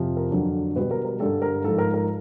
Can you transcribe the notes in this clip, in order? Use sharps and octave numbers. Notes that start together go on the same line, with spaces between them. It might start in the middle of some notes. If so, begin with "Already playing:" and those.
Already playing: F2 C3 F3
A#4
F2 D3 F#3
B2 G3 B4
A#4
A#4
G2 D3 G3 A4
A#4
G#2 F3 A4
A#4
A#4